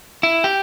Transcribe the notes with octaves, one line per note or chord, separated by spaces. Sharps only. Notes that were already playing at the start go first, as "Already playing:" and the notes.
E4
G4